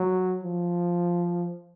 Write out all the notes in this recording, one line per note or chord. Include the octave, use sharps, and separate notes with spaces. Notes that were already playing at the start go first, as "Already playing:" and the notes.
Already playing: F#3
F3